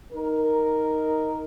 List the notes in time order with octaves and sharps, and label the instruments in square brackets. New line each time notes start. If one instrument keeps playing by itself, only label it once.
[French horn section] D#4 A#4